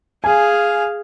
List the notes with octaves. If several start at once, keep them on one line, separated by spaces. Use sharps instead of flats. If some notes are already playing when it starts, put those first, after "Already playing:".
G#4 F5 G#5